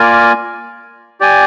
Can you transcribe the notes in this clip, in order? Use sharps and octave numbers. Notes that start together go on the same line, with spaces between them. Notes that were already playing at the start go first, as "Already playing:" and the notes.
Already playing: A#3 F4 A#4 D5 G#5
G4 D5 G#5